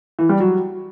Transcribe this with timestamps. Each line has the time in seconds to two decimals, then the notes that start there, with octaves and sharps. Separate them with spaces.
0.19 E3
0.29 G3
0.40 F#3